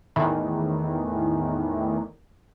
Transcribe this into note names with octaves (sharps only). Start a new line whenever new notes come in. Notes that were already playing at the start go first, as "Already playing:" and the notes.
E2 A2 D#3 E3